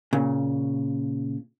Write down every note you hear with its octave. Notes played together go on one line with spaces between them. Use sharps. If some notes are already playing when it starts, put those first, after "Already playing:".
A#2 C#3